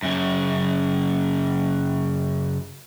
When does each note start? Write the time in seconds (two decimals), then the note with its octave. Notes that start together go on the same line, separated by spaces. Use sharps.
0.02 F#2 C#3